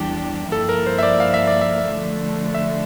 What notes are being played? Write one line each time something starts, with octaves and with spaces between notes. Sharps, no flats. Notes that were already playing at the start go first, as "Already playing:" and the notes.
Already playing: E2 E3 G3 D4 G4
G2 F3 A#3 E4 A4
A#4
C5
E5
D5
F5
E5
D5
E5
D3 F3 A3
E5